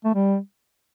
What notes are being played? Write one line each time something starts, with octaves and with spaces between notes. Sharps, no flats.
A3
G3